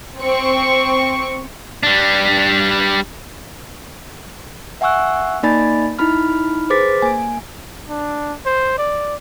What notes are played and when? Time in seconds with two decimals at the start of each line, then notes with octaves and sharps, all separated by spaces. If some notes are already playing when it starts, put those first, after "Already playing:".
0.20 C4 C#6
1.83 G3 D4
4.81 E5 F#5 G#5 C#6 E6 F#6
5.43 A#3 D#4 D5 G#5 B5 A6
5.99 D#4 E4 B5 F6
6.70 G#4 B4 C5 D6 A6 B6
7.02 A#3 G#5
7.89 D4
8.46 C5
8.78 D5